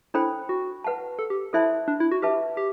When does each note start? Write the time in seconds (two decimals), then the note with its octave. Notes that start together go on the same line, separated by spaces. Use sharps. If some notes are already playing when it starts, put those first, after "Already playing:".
0.14 D4 E4 A4 C5 G5 B5
0.49 F#4
0.84 B4 F#5 A5
1.19 A4
1.30 G4
1.53 E4 A4 C5 E5 A5 C6
1.88 D4
2.00 E4
2.11 F#4
2.22 G4 B4 E5 A5
2.57 G4